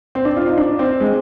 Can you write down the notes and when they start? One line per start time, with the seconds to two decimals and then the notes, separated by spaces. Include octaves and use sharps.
0.15 C4
0.25 D4
0.37 F4
0.47 D#4
0.58 D4
0.79 C4
1.00 G#3